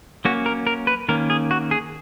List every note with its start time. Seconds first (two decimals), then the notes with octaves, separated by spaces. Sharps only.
0.25 F#3 A#3 C#4 F#4
0.46 A#4
0.67 A#4
0.87 B4
1.09 D#3 A#3 C#4 A#4
1.30 G#4
1.51 F#4
1.71 G#4